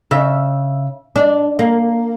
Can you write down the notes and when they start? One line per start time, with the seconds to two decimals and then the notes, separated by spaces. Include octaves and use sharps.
0.11 C#3 E5
1.16 D4
1.59 A#3